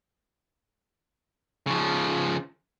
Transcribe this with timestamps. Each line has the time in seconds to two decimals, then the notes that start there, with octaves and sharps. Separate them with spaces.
1.67 C#3 F3